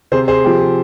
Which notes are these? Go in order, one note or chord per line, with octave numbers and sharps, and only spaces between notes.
C3 G#4 C5
G#4 C5
F3 C4 G4
G#4